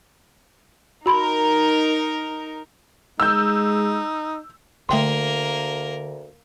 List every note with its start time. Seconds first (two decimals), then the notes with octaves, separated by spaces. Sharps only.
1.06 D#4 F#4 A#4 B5 C6
3.20 G#3 D#4 E6 G6
4.89 D2 D3 A3 A#3 A#4 G5 C6